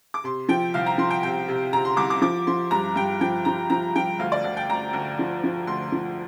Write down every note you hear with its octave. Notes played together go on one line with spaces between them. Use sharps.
D6
C3 C6
F3 G5
C2 F5
A#5
F3 C6
G5
C3 G5
C3
C3 A#5
C6
C2 D6
D6
F3 D6
F3 C6
G2 A#5
G2 G5
F3 G5
F3 A#5
F3 A#5
F3 G5
D2 F5
D5
D2
G5
D2 A#5
D2
F3
F3
D2 C6
F3